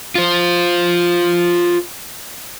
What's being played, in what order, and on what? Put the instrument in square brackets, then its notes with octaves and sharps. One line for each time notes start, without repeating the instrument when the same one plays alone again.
[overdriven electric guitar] F4 C5